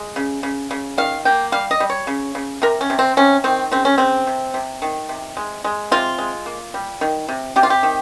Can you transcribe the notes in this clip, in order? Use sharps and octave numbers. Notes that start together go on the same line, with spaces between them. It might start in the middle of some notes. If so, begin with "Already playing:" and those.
Already playing: G#3
C#3
C#3
C#3
D#3 F5
A#3 G5
G3 F5
D#5
G3
C#5
C#3
C#3
C3 A#4
C#4
C3
C4
C3 C#4
D#3 C4
C#3 C4
C#4
C#3 C4
C3
C3
D#3
C3
G#3
G#3
C3 F4
G#3
A#3
G3
D#3
C3
C3 G4
F4
G4
D#3